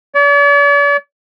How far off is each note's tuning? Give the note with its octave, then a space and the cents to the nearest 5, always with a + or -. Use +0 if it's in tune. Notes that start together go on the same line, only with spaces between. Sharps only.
D5 -45